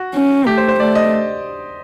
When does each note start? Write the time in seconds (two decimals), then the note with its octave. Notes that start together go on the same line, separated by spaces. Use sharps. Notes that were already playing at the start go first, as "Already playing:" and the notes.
Already playing: F#4
0.15 C#4
0.47 A3 G4
0.58 C5
0.68 C5
0.80 A3 D5
0.95 D#5